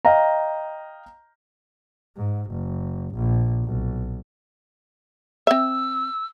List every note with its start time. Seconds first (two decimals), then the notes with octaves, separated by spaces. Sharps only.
0.05 D#5 F5 G5 A#5
2.17 G#2
2.51 F#1
3.15 A#1
3.64 B1
5.47 C4 E5 E6